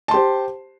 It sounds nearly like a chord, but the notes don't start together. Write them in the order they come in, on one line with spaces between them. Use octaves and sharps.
A5 C6 G4 C5